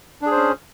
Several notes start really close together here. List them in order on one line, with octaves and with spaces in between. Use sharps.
D4 G#4 C5 C#4